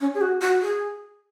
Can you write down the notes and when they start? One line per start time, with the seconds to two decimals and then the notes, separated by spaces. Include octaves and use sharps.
0.01 C#4
0.14 G#4
0.21 F#4
0.41 F#4
0.62 G#4